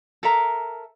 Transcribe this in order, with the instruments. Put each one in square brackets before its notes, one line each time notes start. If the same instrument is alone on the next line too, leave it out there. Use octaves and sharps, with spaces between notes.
[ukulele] A4 A#4 E5 A#5